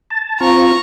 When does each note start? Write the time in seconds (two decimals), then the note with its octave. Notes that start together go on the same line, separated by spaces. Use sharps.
0.10 A5
0.40 C4 F4 A#5 C#6